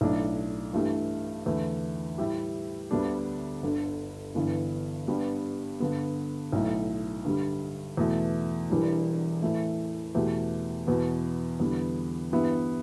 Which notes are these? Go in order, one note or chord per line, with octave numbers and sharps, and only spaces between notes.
B1 A2 A3 D4
G2 E3 A3 G4
E2 D3 A3 E4
A2 G3 E4 G4
D2 D3 G3 B3 D4
G1 G2 D3
G1 G2 E3 B3
G2 G3 B3 D4 G4
G2 D3 B3
B1 A2 A3
G2 D3 G3
E2 B2 A3
E1 E2 E3 G3 D4
A2 E3 A3
E2 B2 A3 G4
E2 B2 B3
E2 D3 G3 B3
G2 E3 B3 E4 G4